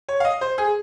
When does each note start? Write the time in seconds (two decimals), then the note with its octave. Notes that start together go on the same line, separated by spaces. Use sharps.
0.09 C#5
0.20 F5
0.25 D#5
0.41 C5
0.58 G#4